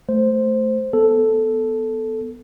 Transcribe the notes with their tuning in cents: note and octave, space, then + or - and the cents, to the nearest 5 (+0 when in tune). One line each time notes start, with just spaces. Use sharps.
A3 +0 C5 +0
B3 +0 A4 +0